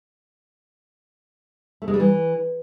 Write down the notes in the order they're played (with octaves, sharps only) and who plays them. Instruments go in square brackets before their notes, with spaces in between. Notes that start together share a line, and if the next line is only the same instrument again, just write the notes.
[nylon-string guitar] A3
G#3
G3
E3